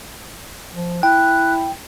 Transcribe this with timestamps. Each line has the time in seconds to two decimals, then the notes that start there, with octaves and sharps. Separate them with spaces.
0.75 F3
1.03 E4 G5 F#6